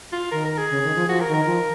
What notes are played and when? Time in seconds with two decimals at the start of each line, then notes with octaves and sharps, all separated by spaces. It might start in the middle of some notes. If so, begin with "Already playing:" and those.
0.12 F4
0.32 D#3 A#4
0.45 A#4
0.58 G#4
0.70 C#3
0.83 D#3
0.96 F3
1.08 F3 F#4
1.21 A#4
1.28 D#3
1.34 A#4
1.46 F3